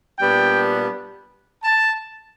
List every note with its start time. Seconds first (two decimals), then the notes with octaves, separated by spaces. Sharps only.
0.19 A#2 G3 B3 D4 G5
1.63 A5